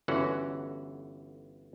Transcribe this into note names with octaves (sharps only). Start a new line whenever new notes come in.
G1 D3 E3 C#4 F#4 F#5